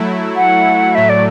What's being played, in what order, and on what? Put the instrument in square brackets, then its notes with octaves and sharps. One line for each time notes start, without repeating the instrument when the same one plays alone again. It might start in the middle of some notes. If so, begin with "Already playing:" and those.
Already playing: [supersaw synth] F#3 A3 E4
[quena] F#5
[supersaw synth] A2 F#3 A3 [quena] E5
[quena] D5